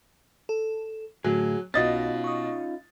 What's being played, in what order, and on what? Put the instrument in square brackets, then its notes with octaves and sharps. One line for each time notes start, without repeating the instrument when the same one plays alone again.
[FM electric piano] A4
[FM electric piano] A2 D3 A3 [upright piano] F#3 [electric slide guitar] G#4
[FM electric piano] B1 [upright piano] B2 D#5 A6 [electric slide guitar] C#4 D#4 F4
[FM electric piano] C#6 D#6